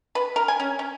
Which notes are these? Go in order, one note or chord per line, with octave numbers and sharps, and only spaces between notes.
B4
A#4
G#5
C#4
C#4